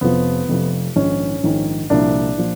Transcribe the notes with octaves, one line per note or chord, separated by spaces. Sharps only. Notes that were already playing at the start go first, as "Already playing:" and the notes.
F1 F2 C3 F3 B3
F1 F2 C3 F3
A#1 G#2 D#3 C#4
A#1 G#2 D#3
C2 A#2 F3 D4
A#2 F3